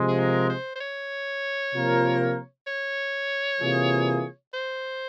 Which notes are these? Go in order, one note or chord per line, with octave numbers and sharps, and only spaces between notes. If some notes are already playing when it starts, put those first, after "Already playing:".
Already playing: C3 F3 G#3
G#4
A#4
C5
C5
C#5
C3 F3 A#3 F4 A#4
C#5
C3 E3 A#3 F4 G#4
C5